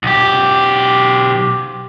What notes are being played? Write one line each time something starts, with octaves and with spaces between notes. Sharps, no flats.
B1 G4